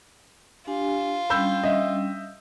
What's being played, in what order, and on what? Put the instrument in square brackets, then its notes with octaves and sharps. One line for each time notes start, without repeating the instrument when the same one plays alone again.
[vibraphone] D4 G4 G#5 [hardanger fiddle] F4
[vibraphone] G3 C#4 D4 [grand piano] B5 E6 G6
[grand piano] D#5 E5